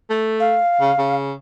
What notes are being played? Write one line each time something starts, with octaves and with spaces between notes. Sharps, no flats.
A3
F5
C#3
C#3